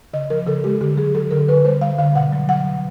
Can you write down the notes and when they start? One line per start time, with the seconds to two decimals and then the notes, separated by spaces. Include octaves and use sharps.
0.13 C#3 D#5
0.30 F3 A#4
0.47 C#3 A4
0.64 G#3 G4
0.81 D3 G4
0.97 F#3 G#4
1.15 F#3 A4
1.31 D3 A#4
1.48 D3 B4
1.65 G3 C5
1.81 G3 F5
1.98 D3 F5
2.15 B2 F#5
2.33 F#3
2.49 F#3 F#5
2.66 B2